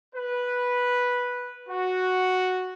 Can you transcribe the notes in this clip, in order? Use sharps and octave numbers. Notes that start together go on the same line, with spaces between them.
B4
F#4